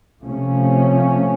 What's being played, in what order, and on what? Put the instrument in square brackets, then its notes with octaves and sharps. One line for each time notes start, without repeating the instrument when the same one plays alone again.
[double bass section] C3 F3 A3 C#4